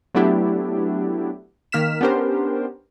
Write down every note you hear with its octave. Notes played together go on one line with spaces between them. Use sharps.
F#3 A3 B3 D4 E4 G4
D#3 A#3 F6 B6 E7
B3 C#4 D4 G4 A#4 C5